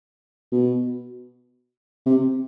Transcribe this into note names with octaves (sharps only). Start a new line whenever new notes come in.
B2
C3